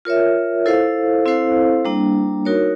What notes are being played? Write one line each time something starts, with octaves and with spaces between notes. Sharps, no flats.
F4 A#4 C#5 E5
E4 A4 C5 F5
C4 E4 A4 C5 F5
G3 A#3 D4
D#4 F#4 A#4 C#5